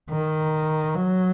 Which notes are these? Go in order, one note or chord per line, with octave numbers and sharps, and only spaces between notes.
D#3
F#3